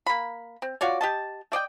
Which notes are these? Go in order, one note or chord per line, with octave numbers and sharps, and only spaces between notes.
A#3 B5
C4
F4 F#4 C#5 D5
G4 D#5 A5
A3 D5 D#5 G5